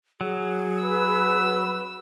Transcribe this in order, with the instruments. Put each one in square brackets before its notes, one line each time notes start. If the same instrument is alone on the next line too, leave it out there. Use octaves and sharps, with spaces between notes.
[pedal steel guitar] F#3 [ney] G#4
[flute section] F#4 B4 B5 [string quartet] E6